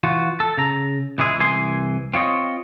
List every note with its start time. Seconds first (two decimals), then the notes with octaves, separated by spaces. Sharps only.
0.04 E3 F4 F#4
0.40 A4
0.58 C#3 A#5
1.18 C#2 E3 G#3 G#4 E5
1.39 C2 E3 G#5 C6
2.14 C4 F4 C#5 D#5